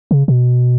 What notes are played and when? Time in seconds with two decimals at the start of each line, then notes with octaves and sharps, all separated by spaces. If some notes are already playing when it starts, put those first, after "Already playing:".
0.11 C#3
0.28 B2